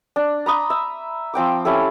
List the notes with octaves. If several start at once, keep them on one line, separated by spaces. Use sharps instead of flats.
D4
A#5 B5 D#6
E5
F3 C4 G5 D6
C#4 E4 G4 A4